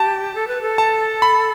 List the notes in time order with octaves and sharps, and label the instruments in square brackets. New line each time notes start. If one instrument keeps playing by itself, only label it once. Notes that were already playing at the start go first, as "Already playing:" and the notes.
Already playing: [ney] G4 [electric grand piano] A5
[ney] A4
B4
A4
[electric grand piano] A5
B5